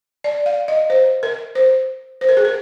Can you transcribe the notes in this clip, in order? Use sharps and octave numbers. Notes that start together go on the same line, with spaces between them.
D5
F5
D#5
C5
A#4
C5
C5
A#4
G#4
A#4